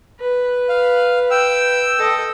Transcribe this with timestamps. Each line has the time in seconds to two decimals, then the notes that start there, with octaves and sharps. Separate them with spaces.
0.20 B4
0.69 F5
1.31 G5 E6
1.99 A4 D#5